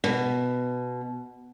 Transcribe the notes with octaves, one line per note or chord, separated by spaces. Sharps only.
B2